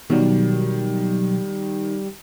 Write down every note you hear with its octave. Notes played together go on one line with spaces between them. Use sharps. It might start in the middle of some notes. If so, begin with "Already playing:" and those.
B2 D#3 F#3 G3